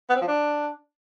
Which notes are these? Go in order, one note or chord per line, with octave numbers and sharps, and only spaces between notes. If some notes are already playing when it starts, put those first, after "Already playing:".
B3
C4
F3
D4